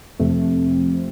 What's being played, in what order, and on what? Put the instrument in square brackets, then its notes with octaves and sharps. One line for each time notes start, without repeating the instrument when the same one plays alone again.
[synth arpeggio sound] F2 C3 F3 A3 C4